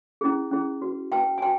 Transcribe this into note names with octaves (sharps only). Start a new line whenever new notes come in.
C#4 E4 G#4
C#4 E4 G#4
F#4 B4
F#4 B4 G5 A5
G#5
F#4 B4 G5 A5